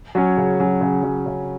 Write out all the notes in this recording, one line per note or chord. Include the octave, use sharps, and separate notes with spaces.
F#3 C#4
C#3
F#3 C#4
C#3
F#3 C#4
C#3